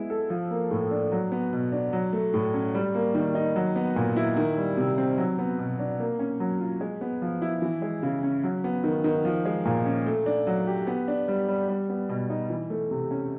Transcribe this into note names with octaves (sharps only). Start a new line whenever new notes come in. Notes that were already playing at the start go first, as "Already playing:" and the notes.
Already playing: G#3 B3 E4
A4
F3
A#3
A2
D4
F#3
B3
B2
D4
F#3
A3
A2
C#4
G3
A#3
D#3
D#4
F#3
B3
A#2
E4
D#3
G3
C3
C4
F#3
B3
B2
D4
A#3
C#4
F#3
F4
G#3
B3
F3
E4
E3
G#3
C#3
C#4
F#3
B3
D#3
D#3
F3
G#3
A#2
C#4
A3
D4
F#3
G4
B3
D4
G3
G3
G3
B3
B2
D#4
E3
A3
C3
C#4